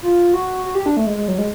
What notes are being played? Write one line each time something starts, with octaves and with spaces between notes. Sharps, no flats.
F4
F#4
F#4
G4
D4
A3
G#3
G#3
F#3
G#3